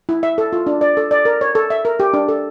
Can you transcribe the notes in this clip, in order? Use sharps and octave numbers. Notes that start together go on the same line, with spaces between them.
E4
E5
A4
F4
D4
D5
A4
D5
A#4
C#5
A4
E5
A#4
G4
D4
A4